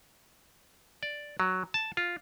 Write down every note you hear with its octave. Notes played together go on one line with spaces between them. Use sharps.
D5
F#3
A5
F4